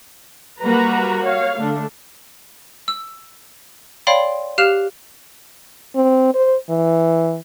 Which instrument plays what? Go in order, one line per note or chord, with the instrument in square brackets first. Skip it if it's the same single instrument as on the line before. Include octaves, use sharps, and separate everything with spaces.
[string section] G3 A#3 F#4 [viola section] B4 A#5
[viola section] C#5 F5
[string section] D3 D4 [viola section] A3
[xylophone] E6
C#5 D5 F5 G5 B5 C6
G4 F5 F6 F#6 E7 F7
[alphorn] C4
C5
E3